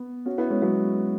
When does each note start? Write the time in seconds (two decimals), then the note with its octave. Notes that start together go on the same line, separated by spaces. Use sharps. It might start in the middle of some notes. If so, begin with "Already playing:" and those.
Already playing: B3
0.26 C#4 F#4
0.38 B3 E4
0.50 G#3 C#4
0.62 F#3 B3